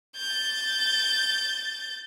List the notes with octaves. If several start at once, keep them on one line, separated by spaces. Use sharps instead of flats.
G6 A6